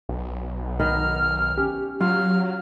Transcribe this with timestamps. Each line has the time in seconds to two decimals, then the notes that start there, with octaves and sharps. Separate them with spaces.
0.09 B1
0.79 D#3 B3 D#5 F6
1.58 C#4 G4
2.00 F#3 F4 F6